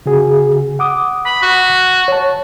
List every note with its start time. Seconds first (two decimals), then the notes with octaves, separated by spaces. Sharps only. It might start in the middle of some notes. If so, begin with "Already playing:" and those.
0.06 C#3 F#4 G#4
0.79 F#5 D6 D#6
1.25 B5
1.42 F#4
2.08 C#5 A5